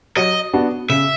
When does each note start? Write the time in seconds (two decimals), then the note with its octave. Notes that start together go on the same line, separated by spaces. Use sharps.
0.17 F#3 D#5
0.53 B3 D4 F#4
0.89 C#3 E5